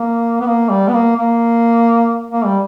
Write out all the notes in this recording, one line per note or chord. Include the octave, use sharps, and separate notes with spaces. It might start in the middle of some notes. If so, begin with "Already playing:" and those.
Already playing: A#3
B3
A#3
G3
B3
A#3
A#3
A#3
G3